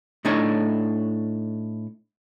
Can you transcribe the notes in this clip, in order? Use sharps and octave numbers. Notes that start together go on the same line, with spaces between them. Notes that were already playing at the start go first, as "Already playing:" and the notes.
A2 A3 D4 D#4 C#5